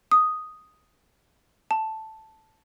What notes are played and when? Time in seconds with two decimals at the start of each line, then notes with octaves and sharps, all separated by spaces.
0.11 D#6
1.71 A5